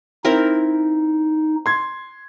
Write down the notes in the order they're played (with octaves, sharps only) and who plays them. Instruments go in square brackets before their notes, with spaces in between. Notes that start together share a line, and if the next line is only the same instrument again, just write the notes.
[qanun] C4 E4 A#4 [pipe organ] D#4
[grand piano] C6 G#6